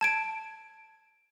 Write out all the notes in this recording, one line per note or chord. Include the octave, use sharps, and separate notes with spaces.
A5 G#6 D7